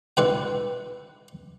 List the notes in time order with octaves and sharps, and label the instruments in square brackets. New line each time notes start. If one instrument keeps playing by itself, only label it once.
[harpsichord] E4 B4 G5